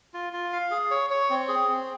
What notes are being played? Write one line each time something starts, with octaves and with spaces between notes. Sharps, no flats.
F4
F4
F5
G#4
C#5
C#5
C4
G#4
C4